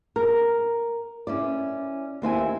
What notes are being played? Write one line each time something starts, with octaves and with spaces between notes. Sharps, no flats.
A#4
C#4 E4 D5
D#2 C4 E4 G#5